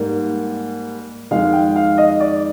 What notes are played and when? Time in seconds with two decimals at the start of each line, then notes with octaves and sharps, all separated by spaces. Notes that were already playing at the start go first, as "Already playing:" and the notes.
Already playing: G#2 G3 A#3
1.31 F2 D#3 G#3 F5
1.53 G5
1.76 F5
1.98 D#5
2.20 D5